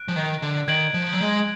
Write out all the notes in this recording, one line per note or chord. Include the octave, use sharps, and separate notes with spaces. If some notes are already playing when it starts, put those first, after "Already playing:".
Already playing: F#6 D7
F3
D#3
D3
D#3 G#6 D7 F#7
F3
F#3
G#3